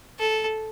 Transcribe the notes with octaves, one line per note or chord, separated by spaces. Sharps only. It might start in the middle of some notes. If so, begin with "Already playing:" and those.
A4